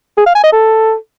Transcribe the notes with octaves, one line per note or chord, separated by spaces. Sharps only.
G#4
F5
G#5
D#5
A4